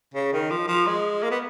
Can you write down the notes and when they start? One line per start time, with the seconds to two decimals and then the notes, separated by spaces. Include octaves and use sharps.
0.14 C#3
0.33 D#3
0.50 F3
0.68 F3
0.87 G#3
1.23 A#3
1.31 B3